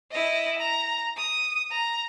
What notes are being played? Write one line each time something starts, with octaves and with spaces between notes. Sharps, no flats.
E4 D#5
A#5
D#6
A#5